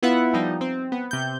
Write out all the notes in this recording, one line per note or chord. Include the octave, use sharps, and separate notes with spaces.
B3 E4 F4 B4 E5 F#5
F3 G3 D#4
C4
B3
C3 G6